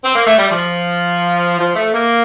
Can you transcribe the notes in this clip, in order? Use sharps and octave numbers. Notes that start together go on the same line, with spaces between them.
C4
A#3
A3
G3
F3
F3
A3
A#3